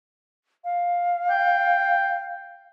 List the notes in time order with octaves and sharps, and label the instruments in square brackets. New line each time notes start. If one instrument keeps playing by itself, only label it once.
[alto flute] F5
[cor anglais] G5